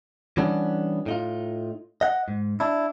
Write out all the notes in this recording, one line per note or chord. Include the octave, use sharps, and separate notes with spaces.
E3 G3 B3 C#4 D4
A2 D#4 F4
D#5 F#5
G#2
D4 E4